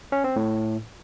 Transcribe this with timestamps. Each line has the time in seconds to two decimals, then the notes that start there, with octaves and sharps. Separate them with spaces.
0.12 C#4
0.24 C4
0.36 A2